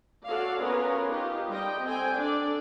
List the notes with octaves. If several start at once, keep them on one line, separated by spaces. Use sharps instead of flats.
F#4 A4 C#5 D5 F5
B3 C#4 F4 A#4 B4 C#5
D#4 F4 G4
G3 D#5 G5
C4 A4 G5 G#5
D4 A4 D5